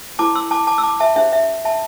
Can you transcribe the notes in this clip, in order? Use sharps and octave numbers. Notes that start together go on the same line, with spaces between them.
E4 A4 C5 A5 D6
C6 E6
A5 D6
A5 D6
E6
A5 D6
E5 A5
D4 G4 C5 E5
E5
E5 A5